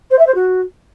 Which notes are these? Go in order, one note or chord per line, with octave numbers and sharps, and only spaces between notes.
C5
E5
C5
F#4